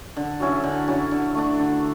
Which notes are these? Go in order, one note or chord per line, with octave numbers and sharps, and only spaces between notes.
D3
F#3 C#4 E4
D3
F#3 C#4 E4
D3
A3 D4
D3